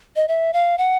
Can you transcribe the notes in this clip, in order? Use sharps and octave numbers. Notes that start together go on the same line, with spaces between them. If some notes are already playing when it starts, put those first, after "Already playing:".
D#5
E5
F5
F#5